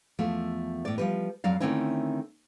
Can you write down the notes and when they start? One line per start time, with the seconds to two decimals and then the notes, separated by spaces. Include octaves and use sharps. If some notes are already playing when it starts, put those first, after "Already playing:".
0.19 E2 F3 A3
0.85 A2 D5
0.98 F3 G3 B4
1.44 F2 F#3 D5 F5
1.60 D3 D#3 A3 C4 C#4 E4